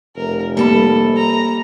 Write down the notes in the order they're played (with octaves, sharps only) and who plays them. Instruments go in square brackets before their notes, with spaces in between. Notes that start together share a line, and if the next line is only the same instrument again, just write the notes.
[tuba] F1 [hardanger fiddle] A#4
[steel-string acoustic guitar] G3 A5 [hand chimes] A#3 B5 [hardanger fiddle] A4
[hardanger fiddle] A#5